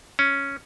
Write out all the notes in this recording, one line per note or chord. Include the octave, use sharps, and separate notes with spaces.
C#4